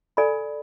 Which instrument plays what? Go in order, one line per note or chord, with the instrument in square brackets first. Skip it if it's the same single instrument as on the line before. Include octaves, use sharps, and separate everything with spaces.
[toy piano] A4 D5 G#5 B5